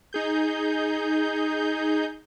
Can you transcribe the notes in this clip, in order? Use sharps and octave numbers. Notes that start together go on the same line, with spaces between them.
D#4 G#4 G6